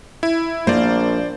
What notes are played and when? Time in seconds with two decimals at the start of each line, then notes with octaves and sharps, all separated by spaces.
0.23 E4
0.67 A#1 A#3 C5 D5